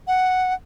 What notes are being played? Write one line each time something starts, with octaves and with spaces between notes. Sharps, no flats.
F#5